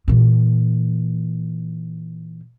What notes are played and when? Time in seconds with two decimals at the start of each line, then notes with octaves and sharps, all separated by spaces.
0.08 A#2 E3